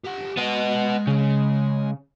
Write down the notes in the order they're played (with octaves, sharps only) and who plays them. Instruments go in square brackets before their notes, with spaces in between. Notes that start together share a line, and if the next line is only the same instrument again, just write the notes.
[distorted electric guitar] G4 F#5
[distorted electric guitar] G#3 [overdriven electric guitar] B3 D#5
[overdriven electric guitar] C#3